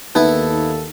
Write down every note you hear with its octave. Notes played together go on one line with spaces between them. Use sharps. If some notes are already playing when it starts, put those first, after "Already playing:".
D#2 A#3 B3 D#4 E4 A4